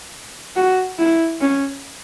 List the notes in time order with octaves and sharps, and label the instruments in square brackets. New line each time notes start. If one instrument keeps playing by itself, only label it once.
[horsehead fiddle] F#4
E4
C#4